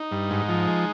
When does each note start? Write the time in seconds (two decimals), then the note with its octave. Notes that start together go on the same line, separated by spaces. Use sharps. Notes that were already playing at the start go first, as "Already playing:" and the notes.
Already playing: D#4
0.12 G2
0.31 G#2
0.49 F3
0.68 G#3